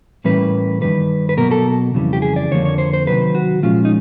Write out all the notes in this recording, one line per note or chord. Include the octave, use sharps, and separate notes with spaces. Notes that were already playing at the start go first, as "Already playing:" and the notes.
A2 E3 G3 A#3 C#4 B4
G2 D#3 G3 B4
B4
B2 F#3 A#3 A#4
A4
F2 C#3 E3 G3
G4
G#4
D5
F2 D3 F3 A#3 C#5
C#5
C5
C5
C3 D#3 F#3 B4
F#4
A#2 F3 G#3 C#4 F4
D#4